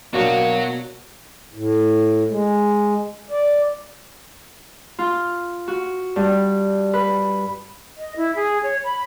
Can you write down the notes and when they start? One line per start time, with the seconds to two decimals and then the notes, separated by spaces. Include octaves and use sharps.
0.14 B2 F#3 A#3 D4 F#4 C#5
1.54 A2
2.30 G#3
3.31 D5
4.99 F4
5.68 F#4
6.16 G2
6.94 B4
7.97 D#5
8.16 E4
8.36 G#4
8.63 C#5
8.84 B5